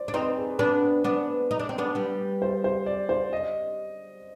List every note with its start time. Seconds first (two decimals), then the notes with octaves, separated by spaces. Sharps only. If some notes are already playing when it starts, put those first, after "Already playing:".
Already playing: C5 D5
0.08 D4
0.14 C4 D#4 B4
0.37 G#4
0.59 B3 D4
1.04 B3 D4
1.51 D#4
1.59 D4
1.69 C4
1.78 B3 D4
1.95 G3 B3
2.42 C5
2.64 C5
2.86 D5
3.09 C5
3.33 D#5